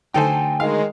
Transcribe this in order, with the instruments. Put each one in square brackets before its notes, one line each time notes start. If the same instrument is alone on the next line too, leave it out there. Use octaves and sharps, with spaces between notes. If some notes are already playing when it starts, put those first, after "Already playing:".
[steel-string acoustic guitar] D3 F#3 A3 [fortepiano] D#4 A4 C5 [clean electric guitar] G5 G#5
[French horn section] D#3 G#3 [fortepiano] F5